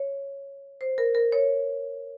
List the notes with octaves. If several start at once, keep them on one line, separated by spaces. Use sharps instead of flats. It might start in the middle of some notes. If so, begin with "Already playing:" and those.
Already playing: C#5
C5
A#4
A#4
C#5